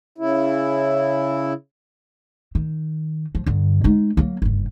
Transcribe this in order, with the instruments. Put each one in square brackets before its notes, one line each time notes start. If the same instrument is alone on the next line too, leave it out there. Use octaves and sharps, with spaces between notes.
[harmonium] C#3 E4
[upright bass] D#3
F3
G2 D3
G#3 D#4
F#3 A#3
F#1 G2